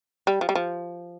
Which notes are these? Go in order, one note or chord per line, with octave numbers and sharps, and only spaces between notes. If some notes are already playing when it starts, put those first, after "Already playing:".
G3
F3
G3
F3